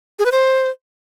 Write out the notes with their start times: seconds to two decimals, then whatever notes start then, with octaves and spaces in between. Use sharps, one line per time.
0.19 G#4
0.25 B4
0.32 C5